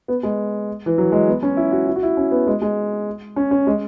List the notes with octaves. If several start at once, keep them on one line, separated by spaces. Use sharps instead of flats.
B3
G#3
E3
F#3
G#3
B3
C#4
E4
F#4
E4
F#4
E4
C#4
B3
G#3
G#3
C#4
C#4
G#3